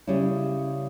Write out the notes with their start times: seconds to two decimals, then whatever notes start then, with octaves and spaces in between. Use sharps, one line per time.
0.07 C#3 G3 C#4 E4